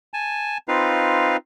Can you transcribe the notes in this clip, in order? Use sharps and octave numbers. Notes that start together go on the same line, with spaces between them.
G#5 A5
C4 D#4 F4 B4 F5